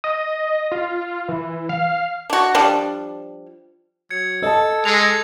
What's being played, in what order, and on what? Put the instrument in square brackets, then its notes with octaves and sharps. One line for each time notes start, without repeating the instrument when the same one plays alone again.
[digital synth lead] D#5
F4
E3
F5
[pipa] D4 F#4
F3 G3 D4
[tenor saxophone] F#3 [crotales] G#6 C#7
[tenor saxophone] A4 [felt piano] D#5 A5
[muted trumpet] G#3 [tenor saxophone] A4 [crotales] F7